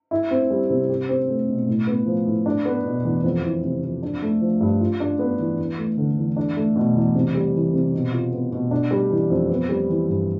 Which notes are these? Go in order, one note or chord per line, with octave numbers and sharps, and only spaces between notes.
E4
C4
G3
C3
G4
C4
A3
B2
A2
B3
F3
A2
D4
B3
B2
E2
F2
E3
C3
F2
D4
A3
F3
G2
F4
D4
B3
E3
E2
A3
D3
E2
D4
A3
B2
E2
C3
G3
E3
C3
B2
F4
B3
B2
D4
G3
E3
F2
B3
G3
E3
G2